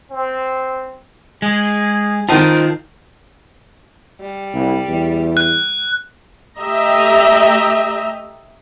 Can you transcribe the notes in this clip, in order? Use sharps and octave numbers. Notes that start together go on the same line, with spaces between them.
C4
G#3 G#4
D#3 F4 C5 D#5 G5 A5
G3
C2
E2
F#6
A3 G4 D#5 E5 A#5